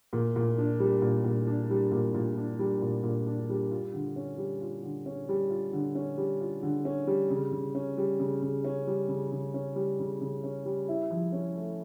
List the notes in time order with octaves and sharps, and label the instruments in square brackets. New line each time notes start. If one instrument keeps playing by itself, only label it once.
[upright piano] A#2
A#2
D4
G3
A#2
A#2
D4
G3
A#2
A#2
D4
G3
A#2
A#2
D4
G3
F4
D3
C#4
G3
F4
D3
C#4
G3
F4
D3
C#4
G3
F4
D3
C#4
G3
C#3
C#3
C#4
G3
C#3
C#3
C#4
G3
C#3
C#3
C#4
G3
C#3
C#3
C#4
G3
E4
F3
C#4
A3